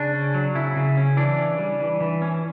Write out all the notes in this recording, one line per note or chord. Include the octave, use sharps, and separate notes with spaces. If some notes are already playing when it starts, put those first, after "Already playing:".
Already playing: C#3 D4
C#4
F#3
C#3 E4
C#3
C#4
E3 D4
C#4
G3
E3
E3
C#4